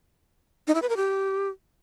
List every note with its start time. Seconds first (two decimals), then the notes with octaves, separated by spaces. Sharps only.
0.67 D#4
0.75 E4
0.82 B4
0.89 A#4
0.97 G4